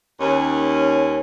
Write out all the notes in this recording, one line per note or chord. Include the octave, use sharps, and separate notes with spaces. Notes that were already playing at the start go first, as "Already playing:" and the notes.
D#2 C#4